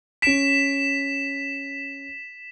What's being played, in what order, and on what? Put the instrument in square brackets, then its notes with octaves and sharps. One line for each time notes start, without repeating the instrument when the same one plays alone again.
[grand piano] C#4 D7 [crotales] B6 E7